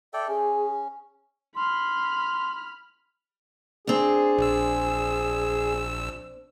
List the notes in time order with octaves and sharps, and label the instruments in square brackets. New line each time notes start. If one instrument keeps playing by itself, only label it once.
[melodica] A4 D5 G5 [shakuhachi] E5
[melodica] C#4 [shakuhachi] G#4
[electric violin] B5 F6 [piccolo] C6
[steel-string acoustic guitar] C4 D4 [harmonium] G#4
[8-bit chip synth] A#1 E6